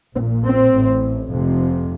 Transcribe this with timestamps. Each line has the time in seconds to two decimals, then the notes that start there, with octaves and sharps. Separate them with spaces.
0.16 A#1 A#2 C4
0.45 C4
0.73 A1 A2
1.30 F1 F2 C3